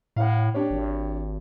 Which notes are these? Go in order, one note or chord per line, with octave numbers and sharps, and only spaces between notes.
A2 F5 F#5
D4 G4 C#5
G#1